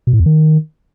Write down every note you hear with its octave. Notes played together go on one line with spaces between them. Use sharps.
B2
A2
E2
D#3